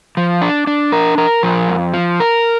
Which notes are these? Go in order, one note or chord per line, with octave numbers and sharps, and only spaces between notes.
F3
D4
D4
A#4
A#4
F3
F2
F3
A#4